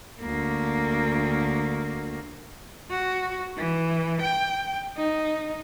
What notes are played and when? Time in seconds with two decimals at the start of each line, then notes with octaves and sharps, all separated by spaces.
0.22 D2 A#3
2.91 F#4
3.57 E3
4.22 G5
4.97 D#4